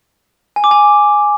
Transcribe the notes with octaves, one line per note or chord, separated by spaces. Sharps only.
G#5
D6
G#5